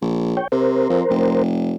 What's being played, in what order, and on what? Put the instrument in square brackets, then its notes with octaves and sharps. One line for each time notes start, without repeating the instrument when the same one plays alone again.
[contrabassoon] A#1
[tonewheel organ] C#5 G5
[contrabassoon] C3 [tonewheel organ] A#4 C5
[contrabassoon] F2
F1